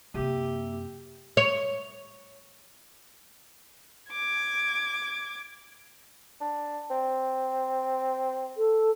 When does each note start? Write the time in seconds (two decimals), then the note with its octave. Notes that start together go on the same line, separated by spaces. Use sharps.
0.14 F#2 C3 A#3 G4 E5 E6
1.37 C#5
4.11 D6 G#6
6.41 D4
6.90 C4
8.57 A4